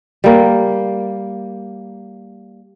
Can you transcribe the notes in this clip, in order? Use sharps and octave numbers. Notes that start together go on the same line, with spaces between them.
G3 A#3